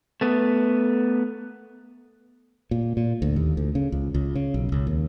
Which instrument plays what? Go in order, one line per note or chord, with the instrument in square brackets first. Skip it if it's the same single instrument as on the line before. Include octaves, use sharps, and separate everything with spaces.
[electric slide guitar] A3 B3
[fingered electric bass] A#2
A#2
D2
D#2
D2
C#3
C#2
C#2
C#3
B1
C#2
D#2